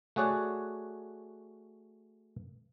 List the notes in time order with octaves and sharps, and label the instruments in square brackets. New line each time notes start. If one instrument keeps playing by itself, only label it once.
[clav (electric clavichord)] A3 F#4 G#4 C#5 D5 F#5